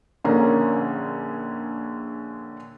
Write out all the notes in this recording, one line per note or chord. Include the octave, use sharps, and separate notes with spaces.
A#1 D3 A#3 C#4 A#5